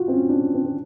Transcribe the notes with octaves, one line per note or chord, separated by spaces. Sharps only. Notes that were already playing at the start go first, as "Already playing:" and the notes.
Already playing: F4 F#4
C4
C#4
D4
C#4
C4
C4